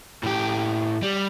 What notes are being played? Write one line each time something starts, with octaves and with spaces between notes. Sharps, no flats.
A2 G4
G3